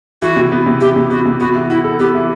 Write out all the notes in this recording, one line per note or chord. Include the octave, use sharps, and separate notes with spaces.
E3 F#4
C3
B3
C3
E3 G4
C3
B3 F#4
C3
B3 F#4
E3
E4 F#4
A4
B3 G4
E3